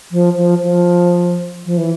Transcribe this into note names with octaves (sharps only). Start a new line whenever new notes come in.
F3
F3
F3
F3
E3